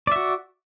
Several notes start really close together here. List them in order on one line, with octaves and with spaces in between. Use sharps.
D5 E5 F#4